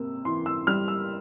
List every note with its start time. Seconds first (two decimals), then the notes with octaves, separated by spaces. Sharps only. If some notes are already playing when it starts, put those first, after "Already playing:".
Already playing: C3 A#3 E6
0.25 E3 C6
0.46 E6
0.67 G3 F6
0.88 E6